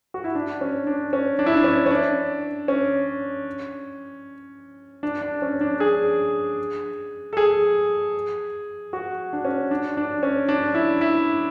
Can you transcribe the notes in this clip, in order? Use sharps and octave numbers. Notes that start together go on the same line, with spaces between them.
F#4
E4
D4
C#4
D4
C#4
D4
E4
D4
C#4
C#4
D4
C#4
D4
D4
C#4
D4
G#4
A4
G#4
F#4
D4
C#4
D4
D4
C#4
D4
E4
E4